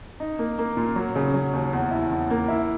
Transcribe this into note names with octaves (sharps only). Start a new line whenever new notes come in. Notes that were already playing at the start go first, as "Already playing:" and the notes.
D#4
A#3
A#3
A#2
F#3
C#3
F#3
D#2
E2
E4
E2
A#3
E4